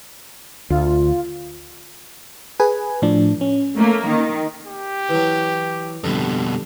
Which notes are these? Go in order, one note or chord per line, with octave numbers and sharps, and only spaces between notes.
D2 F4
G#4 B4 G#5
A2 F3 D4
C#4
A3 A#3
D#3
G4
E3 F#3
F2 B2 D3 G3